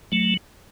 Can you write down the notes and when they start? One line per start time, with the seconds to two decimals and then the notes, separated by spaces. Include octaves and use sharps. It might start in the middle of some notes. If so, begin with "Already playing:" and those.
0.12 F#3 A3